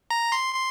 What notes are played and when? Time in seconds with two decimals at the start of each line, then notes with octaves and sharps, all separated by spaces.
0.10 A#5
0.32 C6
0.54 C6